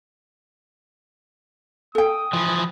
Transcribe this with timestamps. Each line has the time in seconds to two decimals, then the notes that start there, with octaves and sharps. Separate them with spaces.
1.95 A4 G5 D#6
2.33 E3 F3